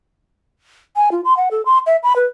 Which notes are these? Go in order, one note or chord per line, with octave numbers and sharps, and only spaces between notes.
G#5
F4
C6
F#5
A4
C6
E5
B5
B4